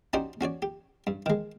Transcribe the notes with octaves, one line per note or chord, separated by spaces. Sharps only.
C#4 D#4 F#4 G4 C5 D5
C#4 F#4 C#5 D5
G4
G2
D#3 G#3